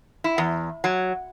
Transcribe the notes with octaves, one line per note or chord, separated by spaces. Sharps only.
E4
E2
F#3